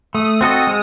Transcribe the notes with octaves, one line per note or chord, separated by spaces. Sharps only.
A3 D#6
C4 F#4 A4 D#5
G#3